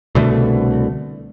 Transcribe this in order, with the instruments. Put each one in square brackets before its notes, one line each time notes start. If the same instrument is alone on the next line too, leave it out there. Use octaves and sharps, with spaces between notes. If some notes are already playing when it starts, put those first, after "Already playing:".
[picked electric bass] C2 B2 D3 A3